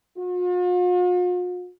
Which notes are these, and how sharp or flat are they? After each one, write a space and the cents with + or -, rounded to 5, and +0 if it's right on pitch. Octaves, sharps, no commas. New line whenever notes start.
F4 +45